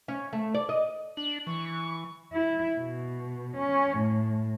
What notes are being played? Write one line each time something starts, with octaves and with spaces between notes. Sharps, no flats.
C#4
A3
D5
D#5
D4 F#7
E3 C#6
E4
B2
C#4
A2